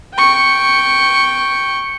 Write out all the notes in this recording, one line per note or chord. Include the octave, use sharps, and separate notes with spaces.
G5 C#6